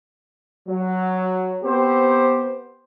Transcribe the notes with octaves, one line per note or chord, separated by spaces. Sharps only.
F#3
B3 C4 G4 C5